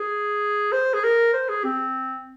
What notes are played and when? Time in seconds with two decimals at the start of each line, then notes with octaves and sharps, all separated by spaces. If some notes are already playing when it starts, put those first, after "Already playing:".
Already playing: G#4
0.73 C5
0.94 G#4
1.04 A#4
1.33 C5
1.49 G#4
1.65 C4